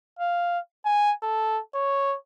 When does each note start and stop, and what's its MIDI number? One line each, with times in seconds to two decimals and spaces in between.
0.19 0.59 77
0.85 1.13 80
1.22 1.60 69
1.74 2.16 73